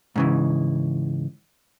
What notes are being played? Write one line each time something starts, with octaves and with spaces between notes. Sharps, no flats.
G#2 C#3 E3